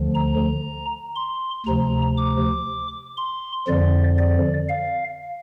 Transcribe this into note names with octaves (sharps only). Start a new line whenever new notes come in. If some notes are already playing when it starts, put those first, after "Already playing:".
Already playing: D2 D3 F3
A#5
C6
D2 C3 F3 A#5
D6
C6
F2 D3 F3 D5
D5
F5